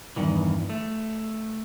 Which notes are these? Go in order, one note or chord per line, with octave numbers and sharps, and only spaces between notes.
E2 G2 D#3 E3
A3